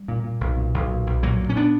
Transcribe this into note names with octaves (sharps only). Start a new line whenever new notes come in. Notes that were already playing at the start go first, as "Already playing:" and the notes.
Already playing: G3
A#2
A#2
B1
A#2
B1
A#2
B1
A#2 F#3 A#3
A#2
C#4
B3 D4